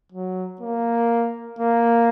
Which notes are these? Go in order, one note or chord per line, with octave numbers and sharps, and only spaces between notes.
F#3
A#3
A#3